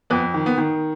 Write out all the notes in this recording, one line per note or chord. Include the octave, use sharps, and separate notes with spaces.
F2 B3
D#3
B3
D#3